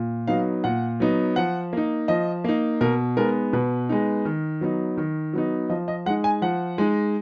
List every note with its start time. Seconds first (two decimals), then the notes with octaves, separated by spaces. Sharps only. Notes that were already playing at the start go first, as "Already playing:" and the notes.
Already playing: A#2
0.27 F#3 B3 D#4 F5
0.64 A#2 F#5
1.00 F#3 B3 D#4
1.36 F3 F#5
1.73 A#3 D#4
2.08 F3 D#5
2.44 A#3 D#4
2.81 B2 A#4
3.17 G#3 B3 D#4 A#4
3.53 B2 B4
3.89 G#3 B3 D#4
4.25 D#3
4.61 F#3 B3 D#4
4.97 D#3
5.33 F#3 B3 D#4
5.69 F3 D#5
5.88 D#5
6.06 G#3 F#5
6.10 D#4
6.24 G#5
6.42 F3 F#5
6.78 G#3 D#4